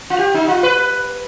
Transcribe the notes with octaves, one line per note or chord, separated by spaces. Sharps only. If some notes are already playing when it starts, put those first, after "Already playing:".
F4
G4
D#4
F4
B4